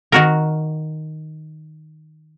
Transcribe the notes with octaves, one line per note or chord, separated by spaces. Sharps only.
D#3 F#4 A#4